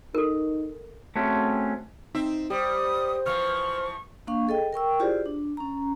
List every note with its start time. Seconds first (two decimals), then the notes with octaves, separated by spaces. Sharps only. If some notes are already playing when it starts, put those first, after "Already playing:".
0.15 D#4 A4 A#4
1.15 A3 C4 C#4 F#4 G#4
2.15 C4 D#4 E5
2.50 G3 G4 C5 D#6
3.26 E3 F3 C#6 F6
4.27 A#3 D4 F5 C#6
4.48 G#4 A4 D#5 G5
4.73 A#4 G5 C#6 E6
5.00 E4 F4 G4 G#4 C5 D5
5.26 D4
5.57 C#4 A#5